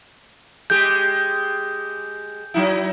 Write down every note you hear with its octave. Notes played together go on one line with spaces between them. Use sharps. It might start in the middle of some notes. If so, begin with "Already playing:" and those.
G#3 G4 G6
F#3 D#4 E4